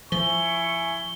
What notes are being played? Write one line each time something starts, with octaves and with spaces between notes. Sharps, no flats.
F3 E4 G#5 C#6 G7